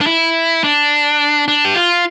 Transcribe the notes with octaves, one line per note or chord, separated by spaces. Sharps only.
D4
E4
D4
D4
G4
F4